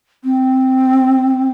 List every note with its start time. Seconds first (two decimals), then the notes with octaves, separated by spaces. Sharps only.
0.23 C4